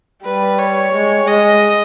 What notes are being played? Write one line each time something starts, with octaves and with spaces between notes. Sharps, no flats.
G3 B4
C#5
G#3
G#3 D#5